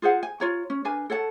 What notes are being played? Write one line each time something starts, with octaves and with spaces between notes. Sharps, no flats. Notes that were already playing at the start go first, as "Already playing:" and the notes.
F4 G#4 C5 F#5
G#5
F4 C#5 A#5
C#4
D4 A#4 B4 G#5
A4 C#5 F#5 A5